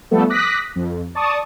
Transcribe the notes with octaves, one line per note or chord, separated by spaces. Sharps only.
F3 G3 A3 B3 A4
D6 D#6 F#6 A#6 B6
F2
D5 A5 C#6 D#6